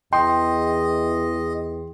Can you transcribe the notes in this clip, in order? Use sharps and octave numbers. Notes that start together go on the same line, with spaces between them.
E2 D#5 G5 C6